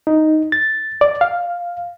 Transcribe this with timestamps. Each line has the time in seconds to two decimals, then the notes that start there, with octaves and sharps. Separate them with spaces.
0.07 D#4
0.52 A6
1.01 D5
1.21 F5